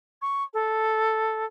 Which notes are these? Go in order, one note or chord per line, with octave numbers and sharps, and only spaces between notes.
C#6
A4